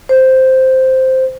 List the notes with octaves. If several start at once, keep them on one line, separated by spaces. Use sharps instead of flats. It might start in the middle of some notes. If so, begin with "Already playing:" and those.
C5